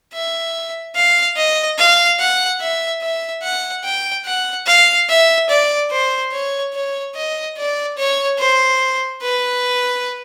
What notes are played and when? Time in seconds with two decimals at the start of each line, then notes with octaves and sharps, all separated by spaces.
0.14 E5
0.96 F5
1.37 D#5
1.78 F5
2.20 F#5
2.61 E5
3.02 E5
3.43 F#5
3.84 G5
4.26 F#5
4.67 F5
5.09 E5
5.50 D5
5.91 C5
6.32 C#5
6.73 C#5
7.16 D#5
7.57 D5
7.98 C#5
8.39 C5
9.22 B4